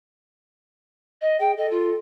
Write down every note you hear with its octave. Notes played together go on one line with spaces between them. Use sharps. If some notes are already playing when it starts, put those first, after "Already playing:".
D#5
G#4 G5
A4 D#5
F4